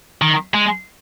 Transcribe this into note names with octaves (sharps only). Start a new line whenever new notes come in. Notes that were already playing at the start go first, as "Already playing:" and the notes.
D#3
G#3